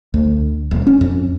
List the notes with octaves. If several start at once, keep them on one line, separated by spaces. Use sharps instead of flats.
D2
D#1
C#4
F2